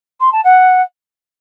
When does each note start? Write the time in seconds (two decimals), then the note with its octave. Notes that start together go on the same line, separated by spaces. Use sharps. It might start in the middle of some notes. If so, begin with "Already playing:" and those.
0.20 C6
0.32 A5
0.44 F#5